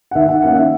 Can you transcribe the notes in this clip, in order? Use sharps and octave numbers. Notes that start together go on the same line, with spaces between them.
F#5
D#2 E5
F#5
D#3 A#3 C#4 F#5
E5